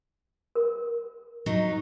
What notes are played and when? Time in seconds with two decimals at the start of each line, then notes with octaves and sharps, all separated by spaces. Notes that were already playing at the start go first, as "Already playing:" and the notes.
0.55 A#4
1.46 F#3 D#4